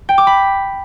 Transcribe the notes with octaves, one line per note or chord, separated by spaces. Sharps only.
G5
D6
B5